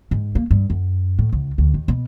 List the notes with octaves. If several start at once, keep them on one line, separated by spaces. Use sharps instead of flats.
G#2
A#3
G2
F#2
A2
C#2
D2
D#2
B2